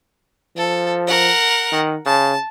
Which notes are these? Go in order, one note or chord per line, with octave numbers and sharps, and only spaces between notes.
F3 A4
A#4 F#5
D#3
C#3 A5